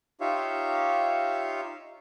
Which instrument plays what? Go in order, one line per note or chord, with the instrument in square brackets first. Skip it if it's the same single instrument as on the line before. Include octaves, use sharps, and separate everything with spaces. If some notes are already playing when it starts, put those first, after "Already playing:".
[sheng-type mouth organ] D#4 F4 G4 C#5 E5 F5